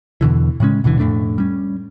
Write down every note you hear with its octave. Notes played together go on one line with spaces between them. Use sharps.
E2 B2 D3 E3
A2 C#3 G#3 C#4
D#1 B2 D3 E3
F2 A2 A3 D4
G3 C#4